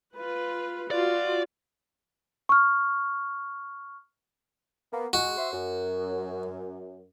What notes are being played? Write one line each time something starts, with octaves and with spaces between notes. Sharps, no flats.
F4 B4
F4 F#4 D5
C#6 F6
A#3 B3
G#3 F#4
C5 E5
F#2